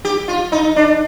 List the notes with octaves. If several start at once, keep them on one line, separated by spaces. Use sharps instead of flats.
G4
F4
D#4
D4